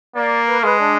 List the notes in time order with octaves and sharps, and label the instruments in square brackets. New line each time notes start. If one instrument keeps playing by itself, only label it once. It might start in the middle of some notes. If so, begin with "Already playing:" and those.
[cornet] A#3 [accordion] D5
[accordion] B4
A#4
[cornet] G#3 [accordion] B4
[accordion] D4